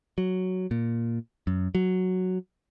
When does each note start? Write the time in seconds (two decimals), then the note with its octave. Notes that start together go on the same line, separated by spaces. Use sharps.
0.18 F#3
0.71 A#2
1.47 F#2
1.75 F#3